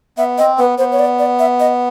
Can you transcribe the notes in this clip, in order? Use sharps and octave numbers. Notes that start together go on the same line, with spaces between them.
B3 E5
C4 D#5
B3 B4
B3 C5
C#5
D5
D5
E5
D#5